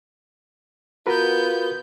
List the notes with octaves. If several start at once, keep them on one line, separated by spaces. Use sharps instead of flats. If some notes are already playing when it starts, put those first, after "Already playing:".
B3 F4 F#4 A#4 B4 G6